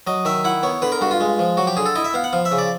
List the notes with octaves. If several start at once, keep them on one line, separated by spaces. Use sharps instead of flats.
F#3 D#5
D#3 E5
E4 F#5
B3 C#5
D3 B4
A#4
G2 F#4
F4
G#3
F3
F#3 F#4
G4
D3 G#4
A4
E4 D#5
E5
B3 F5
F#5
F3 F5
E5
C#3
D5